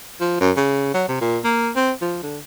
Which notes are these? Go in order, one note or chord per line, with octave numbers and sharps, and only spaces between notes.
F3
F#2
C#3
F#3
C3
A#2
A#3
C4
F3
D3